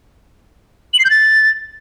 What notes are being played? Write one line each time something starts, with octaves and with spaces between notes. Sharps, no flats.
F#7
C7
G6
A6